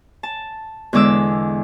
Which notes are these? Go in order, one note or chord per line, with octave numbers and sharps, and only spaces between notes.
A5
E2 D3 G#3 D6 E6